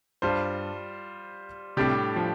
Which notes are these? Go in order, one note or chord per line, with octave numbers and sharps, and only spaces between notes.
G2 G3 F4 C5
A2 C3 G3 D4 G4 D5
F3